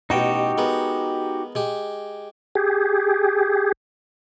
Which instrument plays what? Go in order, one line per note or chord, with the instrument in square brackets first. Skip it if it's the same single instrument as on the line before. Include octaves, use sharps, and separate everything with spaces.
[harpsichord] A1 B2 G5 [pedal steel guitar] D#4 F#4 G4
[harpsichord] G#3 B3 A#4
G#3 G4
[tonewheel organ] G4 G#4